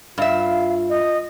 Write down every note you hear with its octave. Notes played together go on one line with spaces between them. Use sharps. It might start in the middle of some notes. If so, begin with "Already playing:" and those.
G2 F4 E5 F5
D#5